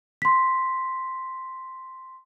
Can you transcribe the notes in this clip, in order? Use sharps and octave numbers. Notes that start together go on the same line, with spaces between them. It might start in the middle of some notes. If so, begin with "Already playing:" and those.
C6 B6